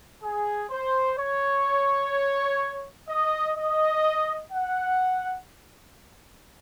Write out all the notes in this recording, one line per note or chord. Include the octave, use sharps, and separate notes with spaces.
G#4
C5
C#5
D#5
D#5
F#5